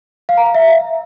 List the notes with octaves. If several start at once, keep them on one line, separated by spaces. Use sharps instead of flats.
F5
A#5
F5
E5